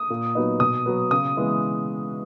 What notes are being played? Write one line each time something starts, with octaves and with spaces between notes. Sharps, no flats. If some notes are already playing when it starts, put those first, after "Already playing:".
Already playing: D#6
A#2
F#3 B3 D#4
B2 D#6
F#3 B3
C#3 D#6
E3 G#3 B3 E4